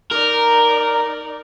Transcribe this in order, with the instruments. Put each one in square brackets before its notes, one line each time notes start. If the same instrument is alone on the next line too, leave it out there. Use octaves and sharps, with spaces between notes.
[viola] D#4 D5 [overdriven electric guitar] A#4